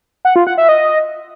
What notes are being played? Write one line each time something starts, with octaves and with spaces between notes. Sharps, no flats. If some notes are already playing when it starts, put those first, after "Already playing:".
F#5
F4
F#5
E5
D#5